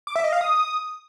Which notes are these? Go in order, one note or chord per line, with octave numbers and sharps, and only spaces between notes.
D6
E5
D#5
F5
D#6